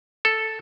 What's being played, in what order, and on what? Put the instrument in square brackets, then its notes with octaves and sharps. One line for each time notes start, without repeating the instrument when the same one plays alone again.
[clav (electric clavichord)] A4